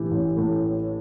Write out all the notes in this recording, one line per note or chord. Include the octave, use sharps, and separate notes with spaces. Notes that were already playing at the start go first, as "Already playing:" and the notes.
Already playing: A1 A2 E3 G4
A1
A2